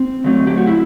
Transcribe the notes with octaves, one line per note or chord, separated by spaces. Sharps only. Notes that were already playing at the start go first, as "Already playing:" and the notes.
Already playing: C4
D3 F#3 A3
G4
F#4
E4